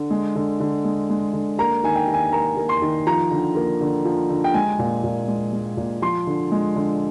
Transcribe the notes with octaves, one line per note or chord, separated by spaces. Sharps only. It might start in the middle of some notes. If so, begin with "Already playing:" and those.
Already playing: D3
G#3
D3
D3
G#3
G#3
D3
A#3 A#5
D#3 G#5
G5
D#3
G#5
A#3 A#5
A#3
C6
D#3
F3 A#5
D3
A#3
D3
F3
D3
G5
G#3 G#5
A#2
A#2
G#3
G#3
A#2
F3 C6
D3
G#3
D3